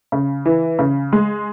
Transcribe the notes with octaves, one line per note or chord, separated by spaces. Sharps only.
C#3
E3
C#3
G#3